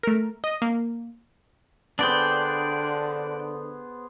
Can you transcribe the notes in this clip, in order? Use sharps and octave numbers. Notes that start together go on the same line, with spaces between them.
A3 A#4
D#5
A#3
D3 B3 D4 G#4 C5 D5 G5